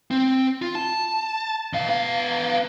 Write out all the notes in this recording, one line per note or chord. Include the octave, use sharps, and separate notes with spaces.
C4
F4
A5
B2 F5
B3 F5